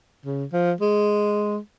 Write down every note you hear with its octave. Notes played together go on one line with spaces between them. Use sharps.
C#3
F3
G#3